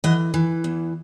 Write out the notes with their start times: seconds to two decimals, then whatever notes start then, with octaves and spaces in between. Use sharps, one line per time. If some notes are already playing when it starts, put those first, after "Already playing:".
0.04 E3 D#5 F#5
0.34 E3
0.64 E2